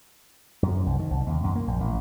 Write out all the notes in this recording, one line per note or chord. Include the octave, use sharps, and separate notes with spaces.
F#2
C2
D#3
C2
D#2
F#2
A#3
A#1
A1